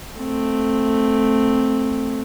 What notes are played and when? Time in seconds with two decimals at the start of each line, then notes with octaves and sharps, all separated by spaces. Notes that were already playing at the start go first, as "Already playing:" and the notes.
0.20 A3 C4